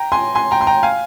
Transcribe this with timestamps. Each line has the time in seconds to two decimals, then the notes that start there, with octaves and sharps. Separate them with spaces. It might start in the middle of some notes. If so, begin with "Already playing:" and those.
Already playing: G5 A#5
0.12 G#5 C6
0.35 G#5 C6
0.51 G5 A#5
0.61 C6
0.67 G5 A#5
0.83 F5 G#5